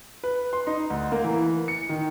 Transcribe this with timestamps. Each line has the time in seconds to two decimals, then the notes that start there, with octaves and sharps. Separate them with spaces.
0.24 B4
0.53 C6
0.67 D#4
0.90 D2
1.12 A#3
1.24 E3
1.68 C#7
1.89 D#3